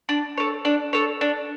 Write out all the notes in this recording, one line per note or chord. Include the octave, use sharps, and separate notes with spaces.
D4
A4 C#5
D4
A4 C#5
D4